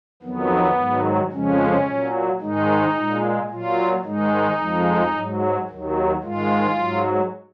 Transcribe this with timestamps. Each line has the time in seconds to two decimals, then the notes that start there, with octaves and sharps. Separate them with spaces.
0.22 F2 D#3 F#3 B3
0.76 G#2 D#3 F#3
1.32 F2 C#3 F3 G#3 C#4
1.86 A#2 F#3
2.41 G#2 D#3 G#3 D#4
2.95 A#2 G#3
3.49 A#2 F#3 F4
4.04 G#2 D#3 G#3 D#4
4.58 F2 F3 G#3
5.14 G#2 F#3
5.68 D#2 D#3 F#3
6.22 G#2 D#3 G#3 F4
6.77 G#2 F#3